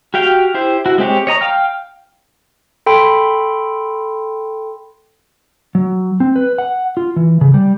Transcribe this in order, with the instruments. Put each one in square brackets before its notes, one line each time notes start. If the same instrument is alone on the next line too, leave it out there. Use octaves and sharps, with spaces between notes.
[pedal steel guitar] F#4 G4 F5 G5
E4 G4 C5
E4 F#4
G#3 C4 G4 C#5
C#5 D#5 A#5 D#6
F5 G5 F6
[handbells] A4 G5 B5 C6
[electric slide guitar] F#3
C4
B4
F#5
F4
E3
C#3
G3